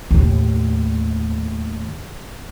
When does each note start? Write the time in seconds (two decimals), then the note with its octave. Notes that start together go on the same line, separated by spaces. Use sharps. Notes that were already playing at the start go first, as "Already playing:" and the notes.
0.11 D#2 A2